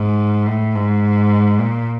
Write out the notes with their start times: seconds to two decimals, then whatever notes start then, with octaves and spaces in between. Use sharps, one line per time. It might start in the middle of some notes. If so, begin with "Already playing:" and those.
Already playing: G#2
0.47 A2
0.75 G#2
1.59 A#2